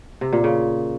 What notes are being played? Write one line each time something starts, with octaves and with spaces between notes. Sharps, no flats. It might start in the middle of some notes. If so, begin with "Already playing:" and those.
C3
A#2
C#3